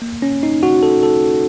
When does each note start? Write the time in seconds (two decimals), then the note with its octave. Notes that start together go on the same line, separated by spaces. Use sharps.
0.02 A#3
0.22 C#4
0.43 D#4
0.63 F#4
0.83 A4
1.03 A4